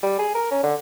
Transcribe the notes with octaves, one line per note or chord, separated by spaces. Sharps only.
G3
G#4
A#4
C#4
D3